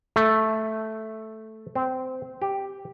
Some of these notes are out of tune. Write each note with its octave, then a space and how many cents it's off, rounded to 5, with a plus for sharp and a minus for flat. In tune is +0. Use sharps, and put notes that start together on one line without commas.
A3 -5
C4 -15
G4 +0